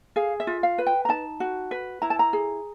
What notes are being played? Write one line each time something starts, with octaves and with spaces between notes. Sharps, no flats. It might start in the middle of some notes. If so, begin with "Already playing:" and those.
G#4 F5
E5
F4
F5
B4
G5
A#5
D#4 A5
F#4
B4
E4 A#5
A5
A#5
G#4